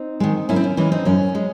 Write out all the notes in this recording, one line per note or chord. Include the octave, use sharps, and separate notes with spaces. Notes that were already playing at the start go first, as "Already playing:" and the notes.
Already playing: C4 D#4
D#3 G#3
F#2 C#4 E4
C4
C#4
E3 G#3 C#4 E4
C4 D#4
F#2 C#4
G#3